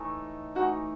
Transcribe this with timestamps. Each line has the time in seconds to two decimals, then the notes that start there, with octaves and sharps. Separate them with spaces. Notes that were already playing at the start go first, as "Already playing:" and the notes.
Already playing: A2 E3 A3 D#4
0.55 E3 A3 D#4 F#4